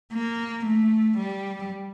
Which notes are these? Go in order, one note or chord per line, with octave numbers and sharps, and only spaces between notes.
A#3
A3
G3